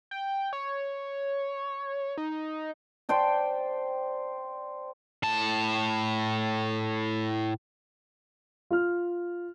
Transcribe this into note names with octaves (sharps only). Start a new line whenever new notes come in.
G5
C#5
D#4
C5 D5 G5 A5
A2 A5
F4 F6